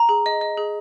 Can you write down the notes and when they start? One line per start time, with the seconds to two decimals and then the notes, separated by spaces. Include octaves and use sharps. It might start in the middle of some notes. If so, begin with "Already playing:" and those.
Already playing: A#5
0.09 G#4
0.26 D#5
0.41 D#5
0.57 G#4